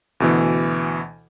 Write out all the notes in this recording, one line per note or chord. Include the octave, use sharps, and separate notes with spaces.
D2 B2 E3